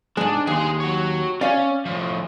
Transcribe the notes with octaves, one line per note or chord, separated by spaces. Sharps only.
G#2 G#3 D4
D#2 G#4 C6
F#4 C#5
C#4 D5 F5
A2 F3